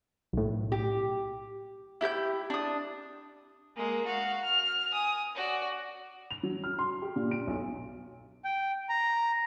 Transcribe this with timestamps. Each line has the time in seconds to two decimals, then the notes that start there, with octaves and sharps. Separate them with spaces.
0.33 B1 A2
0.72 G4
2.01 E4 G4 A#5 G6
2.50 D4 D#6
3.76 G#3 A#3
4.05 F#4 F5
4.44 F6
4.92 G#5 D#6
5.35 F#4 D5
6.30 F7
6.43 F#3
6.64 F6
6.79 C6
7.02 G4
7.16 A#2
7.31 D7
7.47 B1
8.45 G5
8.89 A#5